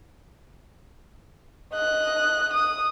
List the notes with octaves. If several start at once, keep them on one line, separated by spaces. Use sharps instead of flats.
D#5 F#6
D#6